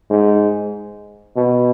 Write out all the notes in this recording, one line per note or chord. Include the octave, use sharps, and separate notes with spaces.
G#2
B2